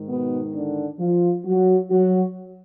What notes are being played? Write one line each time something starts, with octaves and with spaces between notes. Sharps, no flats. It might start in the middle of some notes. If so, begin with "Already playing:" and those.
Already playing: G#2 D#3
B2 B3
D3 D4
F3 F4
F#3 F#4
F#3 F#4